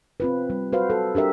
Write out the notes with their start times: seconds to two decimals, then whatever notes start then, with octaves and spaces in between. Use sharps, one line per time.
0.20 C4 F4 B4
0.50 G3
0.72 F#4 B4 C5 F5
0.90 A4
1.15 D4 G4 A#4 E5